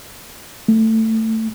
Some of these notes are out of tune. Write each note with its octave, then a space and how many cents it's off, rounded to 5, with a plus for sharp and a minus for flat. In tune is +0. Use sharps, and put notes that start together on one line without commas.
A3 +15